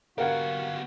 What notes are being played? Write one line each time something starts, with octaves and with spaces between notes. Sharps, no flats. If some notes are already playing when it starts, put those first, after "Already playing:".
B3 F#4 G4 A#4 F5 F#5 G#6